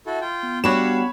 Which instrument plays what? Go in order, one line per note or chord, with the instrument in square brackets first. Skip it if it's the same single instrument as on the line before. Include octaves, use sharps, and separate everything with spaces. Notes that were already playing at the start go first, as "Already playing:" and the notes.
[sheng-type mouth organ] E4 F#4 A4
F4 G5
[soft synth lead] B3
[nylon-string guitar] G3 D4 F#4 [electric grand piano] C#5 B5 E7 [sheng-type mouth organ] F5